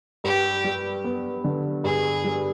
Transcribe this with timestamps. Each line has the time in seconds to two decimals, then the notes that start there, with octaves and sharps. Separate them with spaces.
0.24 G2 G4
0.64 G3
1.04 B3
1.44 D3
1.84 G2 G#4
2.24 G3